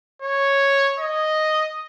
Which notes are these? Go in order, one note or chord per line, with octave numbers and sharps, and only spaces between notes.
C#5
D#5